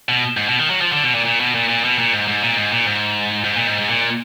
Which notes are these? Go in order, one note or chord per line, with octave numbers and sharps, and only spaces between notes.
B2
G#2
B2
D#3
F#3
F3
D3
B2
A#2
A#2
B2
A#2
A#2
B2
A#2
G#2
G#2
A#2
G#2
A#2
G#2
G#2
A#2
G#2
G#2
A#2